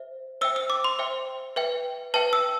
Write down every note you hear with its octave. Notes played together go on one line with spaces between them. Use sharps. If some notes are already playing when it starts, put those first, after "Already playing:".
Already playing: C5 E5
C5 E5 G5 E6
E6
D6
C6
C5 E5 G5
B4 E5 G5
B4 E5 G5 A5
E6